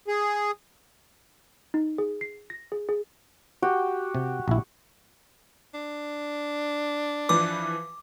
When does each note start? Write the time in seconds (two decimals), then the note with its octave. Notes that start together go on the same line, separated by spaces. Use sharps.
0.08 G#4
1.74 D#4
1.98 G#4
2.21 C7
2.50 A#6
2.72 G#4
2.89 G#4
3.62 F#4 G4 G5
4.15 C3
4.48 A#1 E4
5.74 D4
7.29 E3 F3 B4 D6